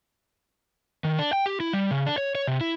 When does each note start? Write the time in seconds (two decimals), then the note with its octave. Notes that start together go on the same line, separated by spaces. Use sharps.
1.04 D#3
1.19 D4
1.33 G5
1.46 G4
1.60 E4
1.73 G3
1.91 C#3
2.06 D4
2.18 C#5
2.35 C#5
2.47 C3
2.61 E4